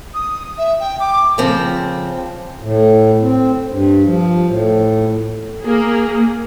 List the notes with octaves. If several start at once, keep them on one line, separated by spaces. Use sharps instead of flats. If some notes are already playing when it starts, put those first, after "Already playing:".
D#6
E5
G5
D6
C#3 F3 C4
A2
C4
G2
F3
A2
A#3 G#4